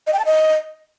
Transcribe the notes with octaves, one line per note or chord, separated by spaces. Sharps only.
D#5
G5
A5
D#5